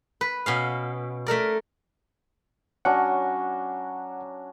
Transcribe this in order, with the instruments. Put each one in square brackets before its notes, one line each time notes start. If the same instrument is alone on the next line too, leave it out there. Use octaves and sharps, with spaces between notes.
[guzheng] B4
B2 C#4 F5
A3 A4 A#4 D5
[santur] F#3 C#4 D4 [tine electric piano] F#5